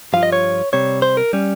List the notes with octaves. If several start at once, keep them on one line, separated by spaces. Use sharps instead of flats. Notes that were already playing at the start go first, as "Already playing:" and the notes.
G2 F3 F4 F5
D#5
C#5
C3 G3 C4 C#5
C5
A#4
G3 C#4